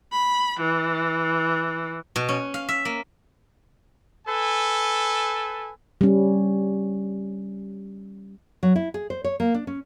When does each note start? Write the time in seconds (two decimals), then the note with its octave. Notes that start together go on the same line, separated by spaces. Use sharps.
0.12 B5
0.60 E3
2.16 B2
2.29 C#4
2.54 F5
2.69 E5
2.85 A#3
4.27 A4 B4 G#5
6.01 G3 C#4
8.63 F#3
8.76 E4
8.94 G#4
9.10 C5
9.24 C#5
9.40 A#3
9.54 D4
9.67 C#4